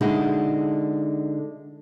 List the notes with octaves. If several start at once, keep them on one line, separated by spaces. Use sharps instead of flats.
D3 G#3 D#4 E4 F#4